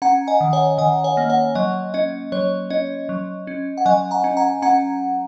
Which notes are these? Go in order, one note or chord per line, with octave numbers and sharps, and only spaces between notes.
C#4 F#5 A#5
D#5 G#5
D#3
C#5 F#5
D#3 D#5 G#5
C#5 F#5
A#3
C#5 F#5
F#3 D#5
C#4 D#5
F#3 C#5
C#4 D#5
F#3
C#4
F#5
F#3 D#5 G#5
F#5 A#5
C#4
F#5 A#5
C#4 F#5 A#5